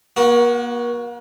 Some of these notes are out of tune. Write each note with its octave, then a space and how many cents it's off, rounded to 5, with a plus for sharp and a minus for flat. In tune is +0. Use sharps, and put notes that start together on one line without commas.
A#3 +40 F#4 +0